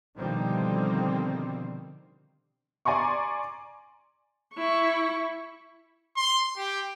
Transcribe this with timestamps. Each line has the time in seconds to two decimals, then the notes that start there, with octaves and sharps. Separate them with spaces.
0.17 B2 D3 D#3 F3 G3 C4
2.85 D5 G#5 A#5 C6 C#6
4.55 E4 C#6
6.17 C6
6.57 G4